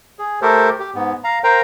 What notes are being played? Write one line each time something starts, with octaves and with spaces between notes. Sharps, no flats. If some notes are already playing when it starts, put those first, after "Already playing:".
G#4
A3 G4 A4 A#4 C5
G4
G#2 B3
F5 A#5
A#4 C5 F5 G5 A#5